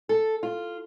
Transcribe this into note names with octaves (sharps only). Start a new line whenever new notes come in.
A4
F4